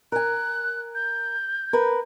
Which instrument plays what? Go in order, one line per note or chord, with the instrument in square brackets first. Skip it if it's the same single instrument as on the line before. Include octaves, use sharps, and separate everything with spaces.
[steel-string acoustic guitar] A#4 G#5 [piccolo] F#6
[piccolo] G6
[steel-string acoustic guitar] A#4 B4